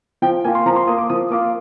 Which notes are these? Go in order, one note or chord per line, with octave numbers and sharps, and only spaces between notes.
F3 G5
A#3 F4 G#5
C6
F3 A#5
C6
A#3 F4 D#6
D6
F3 D#6
A#3 F4 D6